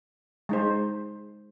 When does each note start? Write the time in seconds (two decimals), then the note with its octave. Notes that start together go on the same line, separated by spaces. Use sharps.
0.49 G#3 D#4 C5